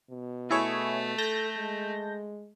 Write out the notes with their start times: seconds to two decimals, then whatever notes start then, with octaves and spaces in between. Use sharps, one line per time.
0.10 B2
0.51 A3 E4 G#4 C#5
1.18 A4 A5 G6 A#6
1.57 G#3